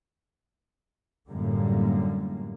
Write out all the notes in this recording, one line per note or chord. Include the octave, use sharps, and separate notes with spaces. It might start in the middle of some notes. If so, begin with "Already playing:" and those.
F#2 A2 D3 G3 A#3